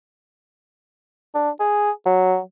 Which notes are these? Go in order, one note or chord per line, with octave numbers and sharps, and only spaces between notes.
D4
G#4
F#3